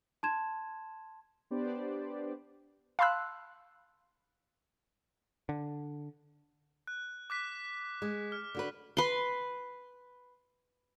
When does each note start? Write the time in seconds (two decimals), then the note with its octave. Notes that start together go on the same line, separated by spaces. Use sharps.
0.23 A5 C6 G#6 E7
1.51 B3 D4 G4 B4 C5 D5
2.99 F5 A5 B5 C6 E6 F#6
5.49 D3
6.87 F#6
7.30 D6 F#6 B6
8.02 G#3
8.32 F6
8.55 D3 F#4 B4
8.97 B4 C6